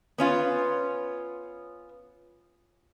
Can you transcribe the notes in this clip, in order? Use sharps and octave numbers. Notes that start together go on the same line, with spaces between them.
B3 C#4 F4